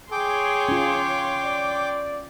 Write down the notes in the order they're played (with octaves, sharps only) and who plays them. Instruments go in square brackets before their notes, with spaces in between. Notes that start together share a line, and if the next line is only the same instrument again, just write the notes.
[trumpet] G#4 [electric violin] C#5 C6 [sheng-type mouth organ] G5 D6
[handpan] C#4 F4
[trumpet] D5